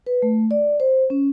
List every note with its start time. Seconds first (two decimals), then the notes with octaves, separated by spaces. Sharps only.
0.07 B4
0.22 A3
0.51 D5
0.80 C5
1.10 C#4